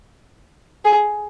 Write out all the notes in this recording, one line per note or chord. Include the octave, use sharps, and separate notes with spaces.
G#4